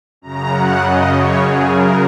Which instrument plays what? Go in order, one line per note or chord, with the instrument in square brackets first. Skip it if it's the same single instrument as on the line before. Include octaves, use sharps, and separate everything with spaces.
[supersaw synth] F#2 C#3 A#5
F#5
D#5
C#5
G#4
A#4